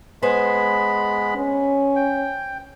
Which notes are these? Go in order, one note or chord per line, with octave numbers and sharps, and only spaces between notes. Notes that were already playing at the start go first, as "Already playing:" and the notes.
G#3 B3 B4 C5 G#5 B5
C#4
G5